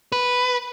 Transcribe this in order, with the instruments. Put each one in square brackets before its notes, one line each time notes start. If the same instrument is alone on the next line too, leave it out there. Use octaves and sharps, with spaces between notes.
[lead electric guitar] B4